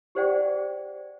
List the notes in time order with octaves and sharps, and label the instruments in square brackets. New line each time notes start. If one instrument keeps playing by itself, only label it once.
[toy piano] G4 G#4 C5 D5 F#5 G5